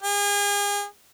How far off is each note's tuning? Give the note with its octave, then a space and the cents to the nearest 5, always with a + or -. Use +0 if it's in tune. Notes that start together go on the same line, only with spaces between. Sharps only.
G#4 -35